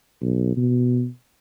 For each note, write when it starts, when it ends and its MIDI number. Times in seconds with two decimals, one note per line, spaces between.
0.21 0.55 35
0.57 1.07 47